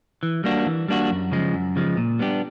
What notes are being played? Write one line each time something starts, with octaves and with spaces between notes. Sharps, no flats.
E3
G3 A#3 D4 F#4
E3
G3 A#3 D4 F#4
F#2
C#3 F3 G#3
F#2
C#3 F3 G#3
A#2
G3 B3 D4 G4